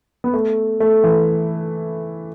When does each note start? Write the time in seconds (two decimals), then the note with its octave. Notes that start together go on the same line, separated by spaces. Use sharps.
0.24 B3
0.34 A3
0.80 A3
1.04 E3